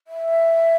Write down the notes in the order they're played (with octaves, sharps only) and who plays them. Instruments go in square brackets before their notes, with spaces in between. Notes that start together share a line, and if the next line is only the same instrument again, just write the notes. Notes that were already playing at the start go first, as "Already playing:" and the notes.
[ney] E5